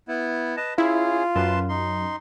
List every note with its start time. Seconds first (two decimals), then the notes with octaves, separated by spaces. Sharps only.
0.08 B3 E4
0.57 B4 D#5 A5
0.78 C#4 E4 F4 G#4
1.35 F#2 B4 A5 C6
1.69 D#4 C6